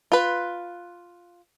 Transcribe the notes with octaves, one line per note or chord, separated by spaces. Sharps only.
F4 B4